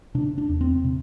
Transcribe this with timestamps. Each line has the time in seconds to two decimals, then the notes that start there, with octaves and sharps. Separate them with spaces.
0.15 C3 D4
0.38 D4
0.49 E2
0.61 C4
0.84 C3